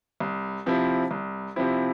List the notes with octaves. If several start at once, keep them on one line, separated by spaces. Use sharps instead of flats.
C2
C3 F3 C4 E4
C2
C3 F3 C4 E4